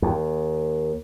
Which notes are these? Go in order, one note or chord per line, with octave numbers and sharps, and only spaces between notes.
D#2